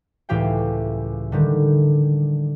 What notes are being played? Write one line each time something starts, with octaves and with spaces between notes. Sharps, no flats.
C#2 A2 E3 G4 F5 G5
D3 D#3 G3